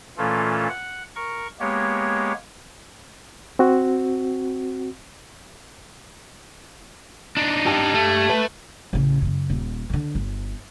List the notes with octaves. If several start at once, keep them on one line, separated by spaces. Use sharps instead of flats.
A#2 E3 A3 C#4 F4 A4
F#5
A#4 C#6
G#3 A#3 B3 G4 C#5
C4 F#4
D4 D#4
G4 A5
A3
B4
A1 C#3
F#2 C#3
D#1
D3 D#3
G1